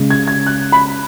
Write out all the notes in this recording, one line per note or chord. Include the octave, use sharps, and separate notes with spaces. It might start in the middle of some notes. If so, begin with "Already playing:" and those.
Already playing: C#3 G#3
G#6
G#6
F#6
B5